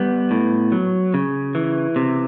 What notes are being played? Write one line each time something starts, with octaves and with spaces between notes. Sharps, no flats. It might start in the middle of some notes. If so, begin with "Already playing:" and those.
Already playing: G3 B3
A2
F#3
C#3
E3
C3